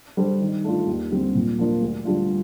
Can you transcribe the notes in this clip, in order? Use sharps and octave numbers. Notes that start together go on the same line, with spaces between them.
G3 D4 A4 C5
D#3
A3 D4 F4
D#2
D3 G3 C4
A#2
F3 A#3 D4 F4
D2
D3 G3 D4 F4